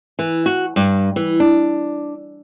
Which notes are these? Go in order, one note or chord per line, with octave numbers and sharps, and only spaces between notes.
E3
F#4
G2
E3
D4